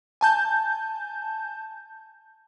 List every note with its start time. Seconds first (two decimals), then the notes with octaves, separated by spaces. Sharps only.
0.21 G#5 A5 G6